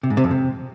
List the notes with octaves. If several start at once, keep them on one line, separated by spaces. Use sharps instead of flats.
C3
G#2
C3
F2
C3